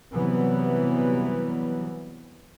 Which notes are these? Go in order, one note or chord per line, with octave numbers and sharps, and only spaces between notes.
C3 E3 F#3 G3 B3